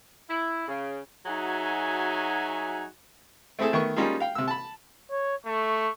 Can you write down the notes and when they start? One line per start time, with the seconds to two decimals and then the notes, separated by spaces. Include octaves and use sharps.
0.29 E4
0.68 C#3
1.26 F#3 D#4 F#4 G#4 E5 G#5
3.59 A3 C4 E4 G#4 A4
3.73 D#3 A3 B3 C#6
3.96 G3 A#3 C#4 D#4 F4 G#4
4.20 F5 G5
4.35 C3 E6
4.48 A5 B5
5.11 C#5
5.45 A3 C#6